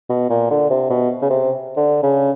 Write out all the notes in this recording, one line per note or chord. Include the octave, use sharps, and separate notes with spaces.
B2
A#2
D3
C3
B2
C#3
C3
D3
C#3